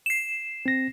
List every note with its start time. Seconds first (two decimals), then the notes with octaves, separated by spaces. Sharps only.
0.06 C7 E7
0.66 C4 A#6